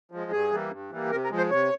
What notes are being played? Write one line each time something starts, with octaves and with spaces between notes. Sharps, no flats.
F3 G#3
G2 G#4
E3 G3 A#3
G2
E3 G3 A#3
C3 A#4
A#4
F3 G#3
C5
C3 C#5